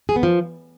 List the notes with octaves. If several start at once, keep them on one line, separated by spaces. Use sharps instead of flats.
G#4
B3
F3